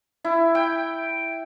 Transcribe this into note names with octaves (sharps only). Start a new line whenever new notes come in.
E4
G5